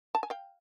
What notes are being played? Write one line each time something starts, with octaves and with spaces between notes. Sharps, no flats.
A5
G#5
F5 G5